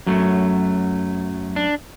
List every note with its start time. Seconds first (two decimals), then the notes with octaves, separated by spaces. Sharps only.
0.07 F#2 F#3 A3
1.56 D4